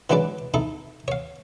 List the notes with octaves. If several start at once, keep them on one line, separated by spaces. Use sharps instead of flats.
E3 F#3 G#3 D4 B4 D5
D#4 E4 A4
C#5 F5